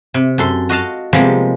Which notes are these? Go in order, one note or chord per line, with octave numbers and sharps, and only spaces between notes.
C3
F#2 A4 C6
F#4 D#5 F5 A5
C3 F3 G3 G#3 A#3 B3